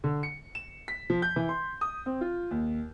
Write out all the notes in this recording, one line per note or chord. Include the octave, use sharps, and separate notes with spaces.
D3
C#7
E7
B6
F3
G6
E3
C6
D#6
C4
F4
D#2